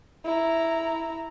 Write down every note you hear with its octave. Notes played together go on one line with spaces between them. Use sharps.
E4 A#5